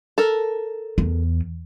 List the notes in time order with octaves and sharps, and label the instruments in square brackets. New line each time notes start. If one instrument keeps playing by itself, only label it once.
[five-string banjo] A4 A#4
[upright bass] E2